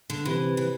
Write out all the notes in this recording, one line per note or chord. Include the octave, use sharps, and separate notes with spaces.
D3
C3 E3
E3